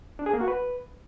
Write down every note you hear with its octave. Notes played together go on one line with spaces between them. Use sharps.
D4
G#4
A#3
F#4
B4